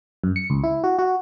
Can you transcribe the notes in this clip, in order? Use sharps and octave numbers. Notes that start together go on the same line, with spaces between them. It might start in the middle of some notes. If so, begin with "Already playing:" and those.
F#2
C#7
C#2
E4
F#4
F#4